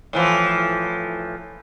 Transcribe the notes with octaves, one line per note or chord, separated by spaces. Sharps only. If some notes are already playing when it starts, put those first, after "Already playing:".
A2 E3 F3